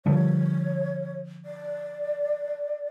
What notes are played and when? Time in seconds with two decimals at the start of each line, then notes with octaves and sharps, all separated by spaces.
0.06 D3 F3 G3 C#5
1.45 D5